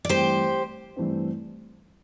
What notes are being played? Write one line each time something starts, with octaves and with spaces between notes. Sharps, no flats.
D5
G2 E3 A3 C4 G4 C5
G2 E3 A3 C4